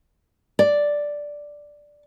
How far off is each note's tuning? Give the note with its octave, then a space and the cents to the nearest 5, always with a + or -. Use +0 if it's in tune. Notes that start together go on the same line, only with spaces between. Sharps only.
D5 +0